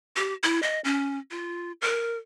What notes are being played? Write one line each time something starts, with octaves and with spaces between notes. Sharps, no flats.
G4
E4
D#5
C#4
F4
A#4